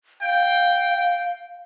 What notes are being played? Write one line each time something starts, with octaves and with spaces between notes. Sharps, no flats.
F5 G5